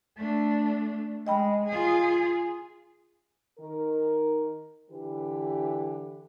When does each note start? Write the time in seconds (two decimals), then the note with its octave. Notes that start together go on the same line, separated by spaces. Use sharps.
0.17 A3 D4
1.27 G#3 D#5 G5 B5
1.69 F4 G#4
3.59 D#3 A#4
4.90 D3 E3 G4 B4